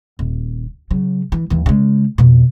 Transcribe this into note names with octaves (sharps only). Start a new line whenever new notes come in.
D#1
C#3 F#3
E3
D#2 E3
C#3 G#3
F2 B2